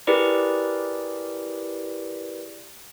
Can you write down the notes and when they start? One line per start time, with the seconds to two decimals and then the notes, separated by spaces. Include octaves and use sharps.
0.07 E4 G4 G#4 A#4 B4 D5